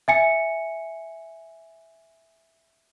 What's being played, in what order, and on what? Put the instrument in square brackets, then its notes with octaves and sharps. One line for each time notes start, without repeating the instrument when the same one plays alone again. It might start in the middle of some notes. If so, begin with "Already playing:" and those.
[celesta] E5 G#5 C#7